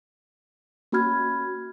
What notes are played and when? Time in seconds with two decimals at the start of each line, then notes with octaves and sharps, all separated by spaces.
0.92 A#3 C#4 F#4 B5 F6 G#6